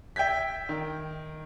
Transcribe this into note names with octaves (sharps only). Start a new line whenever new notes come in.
E5 G5 G6 G#6 B6
D#3